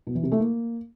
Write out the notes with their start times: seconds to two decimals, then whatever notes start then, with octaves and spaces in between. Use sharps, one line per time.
0.07 B2
0.15 E3
0.23 C3
0.32 A3
0.40 A#3